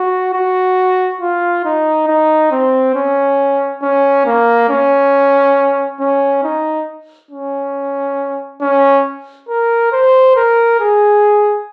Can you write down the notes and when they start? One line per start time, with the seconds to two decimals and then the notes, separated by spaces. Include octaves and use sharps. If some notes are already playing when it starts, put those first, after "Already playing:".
Already playing: F#4
0.34 F#4
1.21 F4
1.65 D#4
2.07 D#4
2.51 C4
2.95 C#4
3.82 C#4
4.26 A#3
4.69 C#4
6.00 C#4
6.43 D#4
7.31 C#4
8.61 C#4
9.49 A#4
9.92 C5
10.36 A#4
10.80 G#4